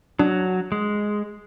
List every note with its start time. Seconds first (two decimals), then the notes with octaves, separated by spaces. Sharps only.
0.19 F#3 D4
0.72 G#3